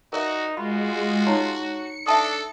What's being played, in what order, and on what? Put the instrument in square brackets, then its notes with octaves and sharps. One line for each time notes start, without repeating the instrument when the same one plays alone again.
[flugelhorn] D#4 [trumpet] F#4 [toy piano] A#4 D5 E5
[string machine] G#3 [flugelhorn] F4 [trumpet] F#4 [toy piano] B5
[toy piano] D#4 C#5 A#5
[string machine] C#7
[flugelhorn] D4 [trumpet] A4 [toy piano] E5 A5 D#6